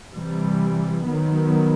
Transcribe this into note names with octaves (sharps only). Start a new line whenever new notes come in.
C3 E3 G3
D#3 F#3 B3